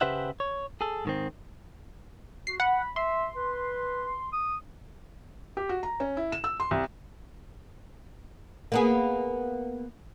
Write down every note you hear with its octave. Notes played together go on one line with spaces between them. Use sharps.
C#3 G4 B4 C5 E5 F#5
C#5
G#4 A4
G#2 D#3 C4
F#4 C7
F#5 B5
E5 C6
B4
D#6
G4
F#4
A#5
C#4
E4
E7
E6
C6
C2
A#3 B3 G#4